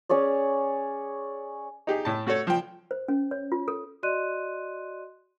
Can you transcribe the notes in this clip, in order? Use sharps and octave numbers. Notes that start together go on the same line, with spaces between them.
C#4 G#4 C#5 D5
D#4 G4 G#4
A2 A5
A3 F#4 A4 C#5
F3 G5
C5
C#4
C#5
F4
A4
F#4 D5 D#5 C6 F#6 D#7